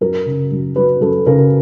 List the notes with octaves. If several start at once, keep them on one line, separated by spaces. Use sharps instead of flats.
F#2 A#4
C#3
F#2
F#3 B4
F#2 A4
C#3 A#4